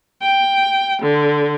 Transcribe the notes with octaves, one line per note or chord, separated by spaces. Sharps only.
G5
D3